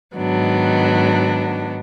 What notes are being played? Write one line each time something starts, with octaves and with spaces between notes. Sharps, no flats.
G#2 D#3 F#3 B3 D4